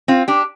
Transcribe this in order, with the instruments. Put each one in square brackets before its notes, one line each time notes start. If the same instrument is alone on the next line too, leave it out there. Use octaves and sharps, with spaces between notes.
[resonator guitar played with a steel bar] C4 F4
D4 G4